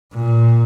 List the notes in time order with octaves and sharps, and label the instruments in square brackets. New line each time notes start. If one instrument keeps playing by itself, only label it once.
[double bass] A#2